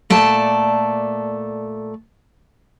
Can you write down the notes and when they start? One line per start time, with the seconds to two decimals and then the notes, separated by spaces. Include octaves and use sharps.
0.10 A#2 A3 D5 A5